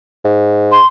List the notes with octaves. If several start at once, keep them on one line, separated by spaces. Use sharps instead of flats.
G#2
C6